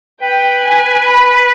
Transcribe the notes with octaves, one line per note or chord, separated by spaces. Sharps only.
B4 G5
G#5
B5